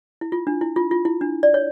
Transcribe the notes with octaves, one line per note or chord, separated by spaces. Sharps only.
E4
F4
D4
E4
F4
F4
E4
D4
D5
C#5